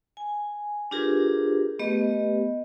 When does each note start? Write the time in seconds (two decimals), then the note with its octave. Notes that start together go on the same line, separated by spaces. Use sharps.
0.17 G#5
0.91 D4 F4 G4 G#4 A#4 B4
1.79 A3 B3 G4 B4 D#5